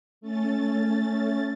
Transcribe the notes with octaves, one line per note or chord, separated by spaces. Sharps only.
A3 C#4 A6